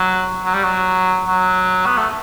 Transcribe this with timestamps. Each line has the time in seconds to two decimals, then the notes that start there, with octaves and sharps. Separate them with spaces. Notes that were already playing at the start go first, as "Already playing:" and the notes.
Already playing: F#3
0.45 F#3
0.54 G3
0.64 F#3
1.27 F#3
1.86 B3
1.97 A3